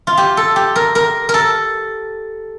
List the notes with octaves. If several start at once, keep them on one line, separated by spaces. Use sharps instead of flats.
F4
G4
A4
G4
A#4
A#4
A#4
A4